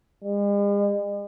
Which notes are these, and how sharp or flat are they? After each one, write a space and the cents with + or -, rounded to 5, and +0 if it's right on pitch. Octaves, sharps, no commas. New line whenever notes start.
G#3 -45